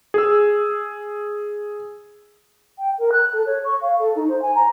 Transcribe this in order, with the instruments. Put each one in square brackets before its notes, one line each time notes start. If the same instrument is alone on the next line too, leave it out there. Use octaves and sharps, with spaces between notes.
[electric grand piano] G#4 E6
[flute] G5
A#4
F#6
A4
C#5
C#6
F5
A4
D#4
C5
G#5
A#5